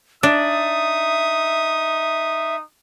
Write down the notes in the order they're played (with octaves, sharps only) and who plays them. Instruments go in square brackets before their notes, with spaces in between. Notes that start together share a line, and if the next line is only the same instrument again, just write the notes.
[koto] D4 [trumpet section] D#4 D#6 [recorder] E5